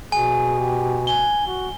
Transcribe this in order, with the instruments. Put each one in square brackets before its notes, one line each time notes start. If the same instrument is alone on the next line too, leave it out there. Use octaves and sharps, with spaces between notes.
[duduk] B2 [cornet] G#4 [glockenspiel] G#5
[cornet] G4
[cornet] G#5 [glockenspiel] G7
[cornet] F#4